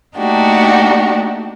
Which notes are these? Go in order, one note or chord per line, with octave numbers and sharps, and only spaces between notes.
A3 A#3 D4 D#4 F#4 G4